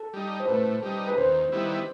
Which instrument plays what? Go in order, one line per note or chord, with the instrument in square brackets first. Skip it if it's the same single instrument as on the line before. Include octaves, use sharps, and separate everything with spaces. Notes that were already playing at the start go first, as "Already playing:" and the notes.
Already playing: [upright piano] A4
[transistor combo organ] G3 D#4
[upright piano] C5
[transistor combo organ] A2 [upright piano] B4
[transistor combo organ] G3 D#4
[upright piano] B4
[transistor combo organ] D#2 [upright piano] C5
[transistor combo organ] D#3 G3 B3 E4